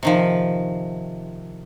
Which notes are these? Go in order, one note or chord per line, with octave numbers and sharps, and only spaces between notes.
C3 D#3 F3